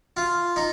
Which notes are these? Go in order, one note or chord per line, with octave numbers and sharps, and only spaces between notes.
F4
D#4